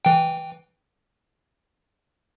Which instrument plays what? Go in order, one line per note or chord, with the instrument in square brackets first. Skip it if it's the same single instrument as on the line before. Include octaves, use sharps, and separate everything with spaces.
[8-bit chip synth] E3 G5